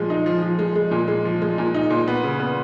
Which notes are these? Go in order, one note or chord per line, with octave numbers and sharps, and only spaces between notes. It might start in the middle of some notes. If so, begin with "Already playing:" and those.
Already playing: A#2 F3 G#3
D#4
F3
F3
G#3
G#3
A#2
G#3
F3
G#3
A#2
D#4
A#2
B3
C#3
B3